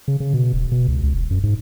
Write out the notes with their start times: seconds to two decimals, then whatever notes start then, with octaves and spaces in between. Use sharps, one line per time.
0.08 C#3
0.20 C#3
0.34 B2
0.53 D#1
0.72 B2
0.88 C#2
1.03 C#2
1.15 E1
1.31 F#2
1.43 G#2